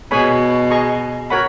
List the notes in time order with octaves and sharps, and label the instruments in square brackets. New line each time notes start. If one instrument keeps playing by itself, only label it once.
[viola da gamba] B2 [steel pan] G#4 C#5 G#5 B5
[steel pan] G#4 D#5 A#5 C#6
F#4 A#4 C#5 F#5 B5